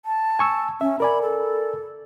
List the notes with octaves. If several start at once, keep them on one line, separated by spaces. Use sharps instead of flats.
A5
G#5 C#6 E6
C#4 E5
A#4 D5 G#5 B5
A4